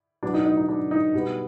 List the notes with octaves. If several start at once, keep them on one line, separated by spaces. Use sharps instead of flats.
B2 F#3 B3 D4
D#4
D#4
D#4
D4
D#4
B2 G3 B3